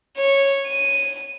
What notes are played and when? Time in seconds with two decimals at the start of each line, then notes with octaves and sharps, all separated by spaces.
0.17 C#5
0.67 D#7